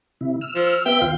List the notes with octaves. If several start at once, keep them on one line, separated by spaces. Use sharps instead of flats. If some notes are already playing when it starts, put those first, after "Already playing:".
C3 E4
E6 F6
F3
B3 E5 G5
D#2 F4 F5